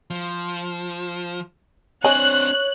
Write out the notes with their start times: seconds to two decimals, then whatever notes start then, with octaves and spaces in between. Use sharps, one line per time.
0.10 F3
2.04 C4 D4 C#5 D#5 G#5 F#6